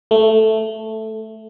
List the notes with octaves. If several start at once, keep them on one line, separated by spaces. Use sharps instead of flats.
A3